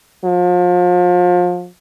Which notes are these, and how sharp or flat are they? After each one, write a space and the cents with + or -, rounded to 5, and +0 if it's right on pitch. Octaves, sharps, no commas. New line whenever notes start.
F3 +35